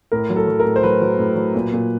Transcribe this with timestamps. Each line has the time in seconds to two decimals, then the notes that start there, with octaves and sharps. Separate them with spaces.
0.12 A2 A#4
0.30 F#3
0.36 A4
0.48 F#3
0.60 A#4
0.65 A2
0.76 C5
0.83 F#3 B4
1.01 F#3
1.19 A2
1.36 F#3
1.55 A#2
1.73 A#2